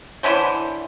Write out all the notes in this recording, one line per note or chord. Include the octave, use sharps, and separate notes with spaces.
D3 E3 C#4 C5